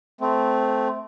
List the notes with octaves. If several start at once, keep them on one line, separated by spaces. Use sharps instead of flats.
A3 C4